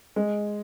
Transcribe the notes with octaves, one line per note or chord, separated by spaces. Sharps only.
G#3